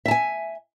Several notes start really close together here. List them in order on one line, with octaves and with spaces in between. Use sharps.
E5 A5 G#5